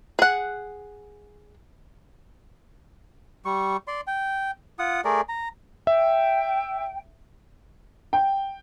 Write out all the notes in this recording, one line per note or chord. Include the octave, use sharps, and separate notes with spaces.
G#4 F#5
G3 C#6
D5 C6
G5
F4 F#5 D#6
A3 G#4 A#4 D5
A#5
E5 G5
G5